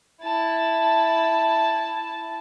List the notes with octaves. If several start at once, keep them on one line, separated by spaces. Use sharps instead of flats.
E4 A5